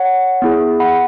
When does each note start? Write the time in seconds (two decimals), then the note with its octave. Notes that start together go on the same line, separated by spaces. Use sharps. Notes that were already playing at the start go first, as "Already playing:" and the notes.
Already playing: C#5 F#5
0.42 B3 E4 G#4
0.80 F#5 B5